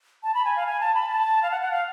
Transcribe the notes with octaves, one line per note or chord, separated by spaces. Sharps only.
A5
B5
G#5
F5
G#5
A5
B5
A5
F5
F#5
F#5
F5